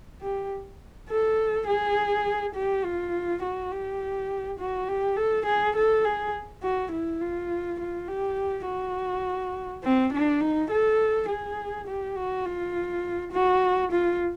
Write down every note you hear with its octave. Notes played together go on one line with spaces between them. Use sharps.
G4
A4
G#4
G4
F4
F#4
G4
F#4
G4
A4
G#4
A4
G#4
F#4
E4
F4
F4
G4
F#4
C4
D4
D#4
A4
G#4
G4
F#4
F4
F#4
F4